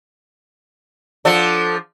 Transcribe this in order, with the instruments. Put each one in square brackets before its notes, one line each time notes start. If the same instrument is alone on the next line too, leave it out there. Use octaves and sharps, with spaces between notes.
[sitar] F3 D4 [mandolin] A4 F#5